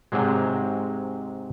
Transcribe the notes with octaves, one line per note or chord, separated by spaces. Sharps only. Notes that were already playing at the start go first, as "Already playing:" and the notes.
G#2 C3 F#3 G#3